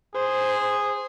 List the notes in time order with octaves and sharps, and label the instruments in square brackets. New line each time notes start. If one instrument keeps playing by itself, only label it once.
[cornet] G#4 [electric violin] C5